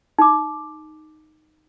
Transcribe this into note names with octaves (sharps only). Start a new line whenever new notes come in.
D#4 D6